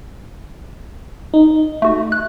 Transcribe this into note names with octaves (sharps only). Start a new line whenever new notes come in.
D#4
A3 F#4
F#6